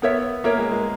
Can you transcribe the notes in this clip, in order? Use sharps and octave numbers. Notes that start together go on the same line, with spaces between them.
B3 A#4 C#5 E5
A#3 A#4 C#5 E5
G#3
G#3